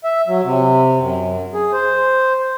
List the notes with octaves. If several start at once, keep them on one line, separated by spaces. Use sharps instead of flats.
E5
F#3
C3
F#2
G#4
C5